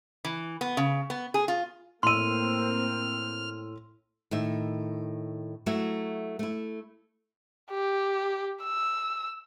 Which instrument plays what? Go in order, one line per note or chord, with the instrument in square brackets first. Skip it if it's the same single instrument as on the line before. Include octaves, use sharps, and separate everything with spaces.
[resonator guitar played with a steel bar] E3
B3
C#3
B3
G#4
F4
[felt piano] A2 E6 [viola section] A#3 C4 [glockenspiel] C6 D#7 [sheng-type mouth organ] F6
[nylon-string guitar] A2 D#3 E5
F#3 A3 E4 F#4 E5
A3 E4
[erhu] G4
E6